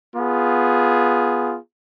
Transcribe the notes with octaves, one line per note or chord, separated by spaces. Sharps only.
B3 F4 G#4